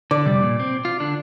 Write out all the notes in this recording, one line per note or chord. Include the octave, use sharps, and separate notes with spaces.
D3 D5
F2 C3 G3
A#2
C4
F4
D3 D4